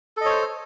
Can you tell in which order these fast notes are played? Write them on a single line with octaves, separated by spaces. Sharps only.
A4 D#5 C#5 C5